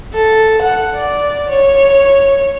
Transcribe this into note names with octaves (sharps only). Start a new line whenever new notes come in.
A4
F#5
D5
C#5